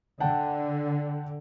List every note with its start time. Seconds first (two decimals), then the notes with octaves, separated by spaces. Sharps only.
0.20 D3 F#5 G5 A5